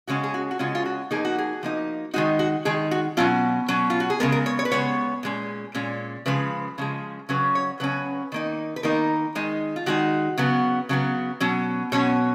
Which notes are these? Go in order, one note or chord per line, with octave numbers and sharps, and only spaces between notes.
C#3 G#3 C#4 F#4
G#4
F#4
F#4
C#3 G#3 C#4 F4
F4
F#4
F3 A#3 D#4 G#4
F#4
G#4
F3 A#3 D#4
D#3 G#3 D#4 F#4
F#4
D#3 G#3 D#4 G#4
F#4
B2 F#3 C#4 F4
B2 F#3 C#4
F4
F#4
G#4
C#3 G#3 B3 A#4
A#4
C#5
C#5
B4
C#3 G#3 B3 C#5
A#2 G#3 C#4
A#2 G#3 C#4
C#3 F3 G#3 B4
C#3 F3 G#3
C#3 F#3 C#4 B4
C#5
C#3 F#3 C#4 B4
D#3 A#3 D#4
B4
D#3 A#3 D#4 A#4
D#3 G#3 D#4
F4
D#3 G#3 D#4 F#4
C#3 F#3 B3
C#3 F#3 B3
B2 F#3 C#4
B2 F#3 C#4 C#5